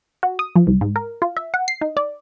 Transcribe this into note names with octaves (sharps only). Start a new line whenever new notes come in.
F#4
D#6
F3
C2
G#2
A#4
F4
E5
F#5
C7
D#4
D5